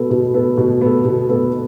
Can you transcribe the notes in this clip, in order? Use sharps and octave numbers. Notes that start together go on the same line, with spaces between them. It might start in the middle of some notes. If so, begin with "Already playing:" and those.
Already playing: B2 B3 A4
B2
B3 A4
B2
B3 A4
B2
B3 A4